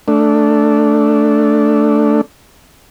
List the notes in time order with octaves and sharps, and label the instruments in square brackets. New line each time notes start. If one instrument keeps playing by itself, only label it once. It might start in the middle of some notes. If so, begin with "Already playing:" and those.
[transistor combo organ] A3 D4